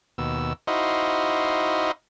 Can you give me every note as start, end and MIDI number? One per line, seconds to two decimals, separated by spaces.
0.18 0.53 39
0.18 0.53 47
0.18 0.53 88
0.67 1.92 63
0.67 1.92 64
0.67 1.92 66
0.67 1.92 72
0.67 1.92 75
0.67 1.92 77